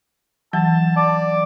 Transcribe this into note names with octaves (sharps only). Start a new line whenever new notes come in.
E3 F#3 A5
D5